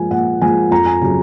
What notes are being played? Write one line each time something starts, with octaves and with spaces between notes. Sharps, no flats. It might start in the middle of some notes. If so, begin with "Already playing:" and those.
Already playing: F3 G#3 G#5
A#2 F#5
F3 G#3 G#5
F2 A#5
G#5
C#3 F#3